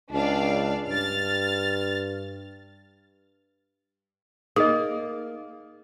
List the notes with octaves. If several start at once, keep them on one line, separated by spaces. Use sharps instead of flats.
C#2 D4 D5 F5
G2 F6 A6
A#3 D#4 G#4 D#5